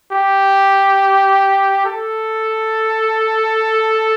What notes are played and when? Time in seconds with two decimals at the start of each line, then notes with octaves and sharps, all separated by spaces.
0.11 G4
1.86 A4